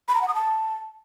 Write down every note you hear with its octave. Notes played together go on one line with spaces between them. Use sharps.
B5
A#5
F#5
D#6
A5